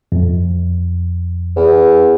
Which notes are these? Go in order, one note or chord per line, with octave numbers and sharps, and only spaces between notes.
F2
E2